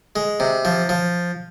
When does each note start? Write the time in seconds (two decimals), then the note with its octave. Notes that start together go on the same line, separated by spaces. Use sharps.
0.16 G#3
0.40 C3
0.65 F3
0.89 F3